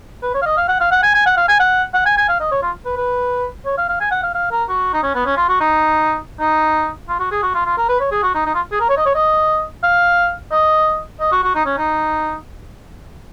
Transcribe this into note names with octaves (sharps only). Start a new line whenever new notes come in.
B4
C#5
F5
D#5
F5
F#5
F5
F#5
G#5
G#5
F#5
F5
G#5
F#5
F#5
G#5
G#5
F5
D#5
C#5
F4
B4
B4
C#5
F5
F5
G#5
F#5
F5
F5
A#4
F#4
D#4
C#4
B3
C#4
F4
F#4
D#4
D#4
F4
F#4
G#4
F#4
F4
F4
A#4
B4
C#5
G#4
F#4
D#4
D#4
F4
G#4
A#4
C#5
D#5
C#5
D#5
F5
D#5
D#5
F#4
F#4
D#4
C#4
D#4